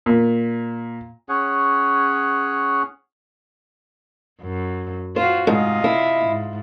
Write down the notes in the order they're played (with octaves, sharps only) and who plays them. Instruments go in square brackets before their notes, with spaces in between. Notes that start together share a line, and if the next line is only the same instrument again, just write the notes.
[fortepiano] A#2
[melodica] C#4 G#4 C#5 F#5
[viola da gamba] F#2
[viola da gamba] F4 F#4 [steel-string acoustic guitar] C5
[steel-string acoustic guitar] G#2 [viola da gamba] C3 F4 D#5
[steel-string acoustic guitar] E4
[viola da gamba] G#2